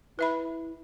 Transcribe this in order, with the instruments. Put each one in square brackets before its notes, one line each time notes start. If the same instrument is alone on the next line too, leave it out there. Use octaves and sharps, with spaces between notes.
[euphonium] E4 [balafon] B4 E5 B5